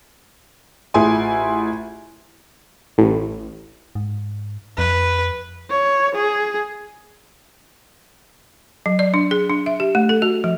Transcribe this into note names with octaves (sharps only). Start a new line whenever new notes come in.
A1 E4 F4 G#4 G#5 C6
A1
G#2
F2 B4
C#5
G#4
F#3
D5
D4
G#4
D4
E5
G4
A3
A4
F#4
F3